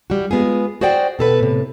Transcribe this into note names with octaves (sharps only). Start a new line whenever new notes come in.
G3 F#4
G#3 B3 F4 G#4
F#4 G#4 C5 D5 F#5 G5
B2 A4 B4
A2 C3